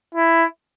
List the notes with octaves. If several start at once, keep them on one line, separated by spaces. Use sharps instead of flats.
E4